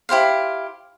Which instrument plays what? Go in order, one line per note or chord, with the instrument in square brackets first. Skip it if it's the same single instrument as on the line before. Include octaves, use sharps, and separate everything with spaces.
[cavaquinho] E4 G4 C5 F5